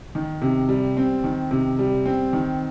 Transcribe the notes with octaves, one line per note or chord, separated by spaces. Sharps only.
D#3
C3
G3
C4
D#3
C3
G3
C4
D#3